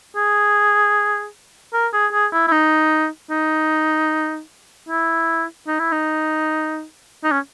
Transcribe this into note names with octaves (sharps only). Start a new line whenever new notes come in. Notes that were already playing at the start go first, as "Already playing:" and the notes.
G#4
A#4
G#4
G#4
E4
E4
D#4
D#4
E4
D#4
E4
D#4
D#4
C#4